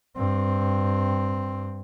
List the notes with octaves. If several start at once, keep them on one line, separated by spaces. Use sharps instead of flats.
G2 C4